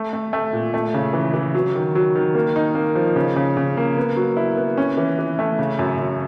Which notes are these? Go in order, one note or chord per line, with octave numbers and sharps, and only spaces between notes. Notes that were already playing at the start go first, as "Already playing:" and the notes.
Already playing: A3
A3
A3
A#2
A3
C#3
E3
E3
F#3
D#3
F#3
D#3
A#3
D#4
A#3
F3
C#3
C#3
C#3
A#3
B3
F#3
E4
B3
C#4
E3
E3
A3
C#3
F#2
F#2